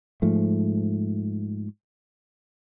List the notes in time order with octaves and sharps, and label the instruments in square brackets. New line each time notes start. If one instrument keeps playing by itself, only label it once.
[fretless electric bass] G#2 F3 A3